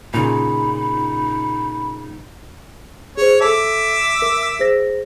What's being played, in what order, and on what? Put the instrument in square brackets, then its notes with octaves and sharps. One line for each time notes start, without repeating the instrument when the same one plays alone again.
[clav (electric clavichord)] A#2 C#3 [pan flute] D#4 [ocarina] B5
[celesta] G#4 C5 [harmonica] C#5
[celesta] A4 A5 [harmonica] E5 D6
[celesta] A#4
G#4 C5 A#6